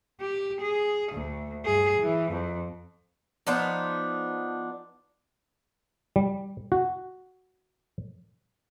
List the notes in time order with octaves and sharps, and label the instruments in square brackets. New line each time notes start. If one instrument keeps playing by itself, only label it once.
[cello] G4
G#4
D2
G2 G#4
E3
F2
[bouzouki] F3 B3 D4 D#4
[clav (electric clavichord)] G3
F#4